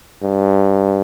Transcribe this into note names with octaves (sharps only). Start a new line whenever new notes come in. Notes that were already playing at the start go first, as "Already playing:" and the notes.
G2